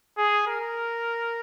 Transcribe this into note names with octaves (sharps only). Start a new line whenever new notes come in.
G#4
A#4